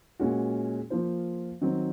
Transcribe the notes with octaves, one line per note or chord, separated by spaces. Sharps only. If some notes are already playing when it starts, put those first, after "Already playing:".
A#2 G#3 C#4 F#4
F3 A#3 F4 C5
D#3 F#3 C4